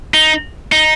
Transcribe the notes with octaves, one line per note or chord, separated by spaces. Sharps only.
D#4
D#4